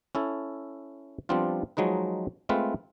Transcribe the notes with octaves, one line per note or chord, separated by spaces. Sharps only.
C#4 E4 A4
F3 G3 B3 C4 D4 F4
F3 F#3 G#3 D#4 B4
G#3 A3 C4 F4 B4